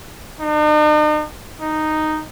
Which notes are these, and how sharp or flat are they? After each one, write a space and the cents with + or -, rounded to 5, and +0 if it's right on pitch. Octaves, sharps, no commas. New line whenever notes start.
D#4 -45
D#4 -5